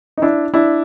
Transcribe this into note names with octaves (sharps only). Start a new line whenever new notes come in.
D#4
D4 E4
D4 E4